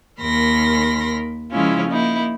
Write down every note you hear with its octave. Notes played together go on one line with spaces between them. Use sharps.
D#2 A#4 B5 C6 A#6
C#3 F3 G#3 C#4 E4 F4
A#3 D#4 E4